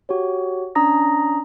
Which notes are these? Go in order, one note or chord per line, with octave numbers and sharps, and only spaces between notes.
F#4 G4 C#5
C#4 D4 A#5 D#6 A#6